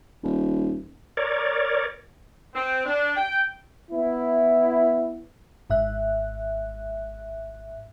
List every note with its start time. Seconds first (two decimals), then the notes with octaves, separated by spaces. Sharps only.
0.23 D#1
1.17 A#4 C#5 D5
2.54 C4
2.86 D4
3.16 G5
3.91 B3 E4
5.70 G#1 G#2 E5 F#6